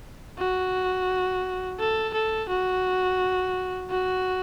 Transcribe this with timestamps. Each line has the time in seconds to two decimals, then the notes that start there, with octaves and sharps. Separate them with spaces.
0.38 F#4
1.79 A4
2.13 A4
2.49 F#4
3.90 F#4